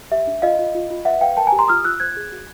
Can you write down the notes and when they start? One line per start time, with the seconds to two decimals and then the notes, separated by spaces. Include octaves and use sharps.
0.11 G4 E5
0.27 D4
0.42 F4 D#5 F5
0.59 F4
0.75 F4
0.90 F4
1.05 B4 E5 F#5
1.21 B4 F5 G5
1.37 A#4 G5 A5
1.47 G#5 A#5
1.52 G4
1.59 A#5 C6
1.68 F4 D#6 F6
1.84 F4 E6 F#6
2.00 C5 F#6 G#6
2.17 G#4
2.32 F#4